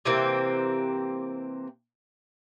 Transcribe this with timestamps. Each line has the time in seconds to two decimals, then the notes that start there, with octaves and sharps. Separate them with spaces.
0.05 C3 E3 A#3 C4